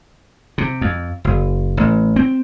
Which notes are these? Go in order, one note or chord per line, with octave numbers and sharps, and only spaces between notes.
C3
F2
F#1
A1
C4